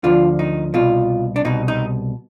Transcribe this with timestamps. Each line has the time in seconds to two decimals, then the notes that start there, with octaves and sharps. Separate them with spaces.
0.04 D2 D3 F3 F4
0.39 D#4
0.74 C2 B2 F4
1.36 D4
1.45 C2 B2 D#4
1.68 D#4